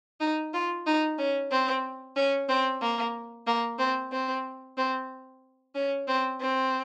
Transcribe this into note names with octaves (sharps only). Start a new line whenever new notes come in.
D#4
F4
D#4
C#4
C4
C#4
C4
A#3
A#3
C4
C4
C4
C#4
C4
C4